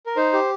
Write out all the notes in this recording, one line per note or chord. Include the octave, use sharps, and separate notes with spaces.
A#4
D#4 C5
G4